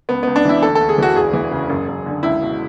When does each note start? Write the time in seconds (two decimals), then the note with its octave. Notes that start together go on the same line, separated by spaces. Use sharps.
0.09 C#2 B3
0.23 C#2 B3
0.36 D4
0.45 E3 E4
0.62 D2 A4
0.75 A4
0.81 D2
0.89 G#4
0.98 E3 F#4
1.16 E1 G#4
1.33 E3
1.51 C#3
1.69 F#1
1.88 F#1
2.06 D3
2.23 C#2 E4
2.41 B2